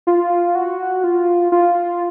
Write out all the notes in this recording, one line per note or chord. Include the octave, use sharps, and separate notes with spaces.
F4
F#4
F4
F4